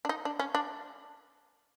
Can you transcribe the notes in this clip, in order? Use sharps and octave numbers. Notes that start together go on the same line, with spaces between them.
D4
D#4
D4
C#4
D4